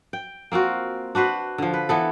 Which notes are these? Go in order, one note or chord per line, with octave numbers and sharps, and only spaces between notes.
G5
A#3 C4 F4 F#4
D4 F#4 B4 C5
D3 F3
B4
E3 B3 A4